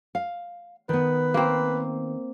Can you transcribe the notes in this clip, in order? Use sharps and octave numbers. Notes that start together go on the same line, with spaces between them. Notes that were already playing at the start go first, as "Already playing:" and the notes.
F5
D#3 B3 B4
A#3 C4